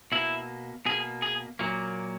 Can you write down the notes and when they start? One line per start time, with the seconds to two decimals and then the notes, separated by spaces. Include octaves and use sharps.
0.12 B2 A#3 E4
0.86 B2 A#3 G#4
1.22 G#4
1.59 A#2 F#3 A#3